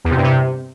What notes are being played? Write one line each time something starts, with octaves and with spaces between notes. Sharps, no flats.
E2
C3
G2
C3